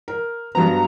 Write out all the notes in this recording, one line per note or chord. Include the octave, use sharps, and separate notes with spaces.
A#4
G2 F#3 B3 A#5